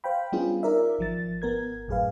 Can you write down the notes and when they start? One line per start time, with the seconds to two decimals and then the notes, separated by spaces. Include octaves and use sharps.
0.04 C5 F5 G5 B5
0.32 G3 B3 C#4 D4 F4 G#4
0.63 D#4 F4 A#4 D5 E5
0.99 G#1 F3 A6
1.42 G#1 B3 A#4 G#6
1.88 G#1 F#2 A2 G#4 B4 F5